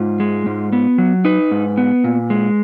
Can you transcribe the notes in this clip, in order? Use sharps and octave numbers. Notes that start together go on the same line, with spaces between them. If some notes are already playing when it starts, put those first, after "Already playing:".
Already playing: G#2 F4
G#3
G#2
B3
F#3
D#4 B4
G#2
B3
A#2
G#3